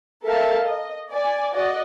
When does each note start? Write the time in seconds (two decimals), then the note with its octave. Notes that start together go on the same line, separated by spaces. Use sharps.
0.24 A4 A#4 E5 F5 A5
0.63 D#5
1.09 D5 G#5
1.52 F#4 D5 D#5